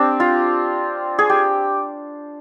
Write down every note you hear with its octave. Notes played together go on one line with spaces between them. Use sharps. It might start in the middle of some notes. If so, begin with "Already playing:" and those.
Already playing: C4 D4 G4
F4
G#4
G4